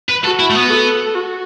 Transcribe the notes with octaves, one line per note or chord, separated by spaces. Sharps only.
B4
F#4 A4
E4
A3
B3
A4
F#4